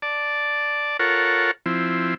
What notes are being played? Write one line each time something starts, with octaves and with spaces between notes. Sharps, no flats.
D5 A5
F4 A4 A#4 C#5 F#5
F3 C4 E4